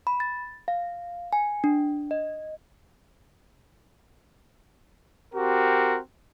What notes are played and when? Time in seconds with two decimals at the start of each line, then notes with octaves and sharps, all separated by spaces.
0.07 B5
0.20 A6
0.68 F5
1.33 G#5
1.64 D4
2.11 D#5
5.34 C4 F#4 G4 A#4